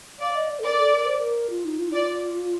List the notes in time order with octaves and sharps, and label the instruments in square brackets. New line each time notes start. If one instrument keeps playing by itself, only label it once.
[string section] D5 [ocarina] F5
[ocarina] D#5
D5
A4
[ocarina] A#4 [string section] D5
[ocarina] A4
A#4
C5
A#4
F4
D#4
F4
D#4
[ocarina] F4 [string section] D5